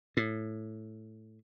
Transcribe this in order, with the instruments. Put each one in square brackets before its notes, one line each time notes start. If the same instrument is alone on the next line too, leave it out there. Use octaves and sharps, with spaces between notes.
[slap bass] A2